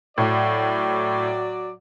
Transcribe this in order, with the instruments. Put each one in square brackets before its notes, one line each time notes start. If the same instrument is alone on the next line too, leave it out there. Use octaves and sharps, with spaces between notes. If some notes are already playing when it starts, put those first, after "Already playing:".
[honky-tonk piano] A2 [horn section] F#3 F#4 D5